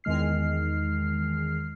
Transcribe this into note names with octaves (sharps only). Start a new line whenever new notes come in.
E2 D#3 G#3 F6 C7